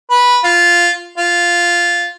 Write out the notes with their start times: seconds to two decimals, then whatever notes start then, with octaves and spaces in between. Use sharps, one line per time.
0.11 B4
0.44 F4
1.18 F4